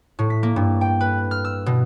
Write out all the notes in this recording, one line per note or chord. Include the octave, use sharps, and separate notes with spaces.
A2
B6
A#3
G2
G5
B4
F6
E6
B2